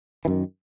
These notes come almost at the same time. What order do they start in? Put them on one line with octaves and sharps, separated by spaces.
E3 F#2 D#3